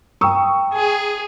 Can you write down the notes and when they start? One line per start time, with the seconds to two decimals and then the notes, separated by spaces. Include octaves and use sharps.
0.21 G5 A#5 C#6 D#6 E6
0.75 G#4